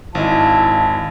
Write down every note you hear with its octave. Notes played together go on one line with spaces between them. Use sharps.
G#1 E4 D#5 F5 A5